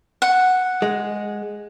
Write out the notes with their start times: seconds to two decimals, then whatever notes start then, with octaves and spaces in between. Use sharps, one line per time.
0.22 F#5
0.82 G#3